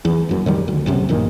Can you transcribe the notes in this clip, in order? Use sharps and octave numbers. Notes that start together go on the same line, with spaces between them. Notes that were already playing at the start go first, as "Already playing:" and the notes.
E2
F#1 F#2
F2 D#3 G3
D2
B1 F#2 C3
A#1 G2 A#2 D#3